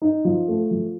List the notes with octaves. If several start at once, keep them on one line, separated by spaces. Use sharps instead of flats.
D#4
F3
A3
F3